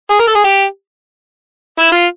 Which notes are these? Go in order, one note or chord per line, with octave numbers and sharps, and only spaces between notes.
G#4
A#4
A4
G#4
G4
E4
F4